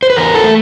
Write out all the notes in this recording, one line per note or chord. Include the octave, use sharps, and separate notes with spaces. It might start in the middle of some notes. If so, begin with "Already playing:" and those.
C5
B4
E2 A#4
A4
A3